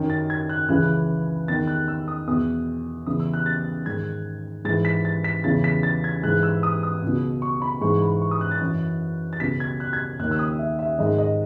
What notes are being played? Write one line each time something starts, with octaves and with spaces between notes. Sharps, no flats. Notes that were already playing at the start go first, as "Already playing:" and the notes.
Already playing: F#2 D#3
A6
G#6
F#6
C#2 C#3 E3 F#6
E2 D#3 A6
F#6
E6
D#6
E2 B2 D#6
E2 C#3 E3 D#6
E6
F#6
A6
G#2 D#3 G#6
G#2 E3 A6
B6
A6
B6
E2 C#3 E3 A6
B6
A6
G#6
G#2 E3 F#6
E6
D#6
D#6
C#2 B2
C#6
B5
G#2 E3 C#6
B5
C#6
D#6
F#6
A6
F#2 E3
A6
C#2 B2 B6
G#6
F#6
G#6
D#2 D#3 F#6
E6
D#6
E5
E5
G#2 D#3 D#5
D#5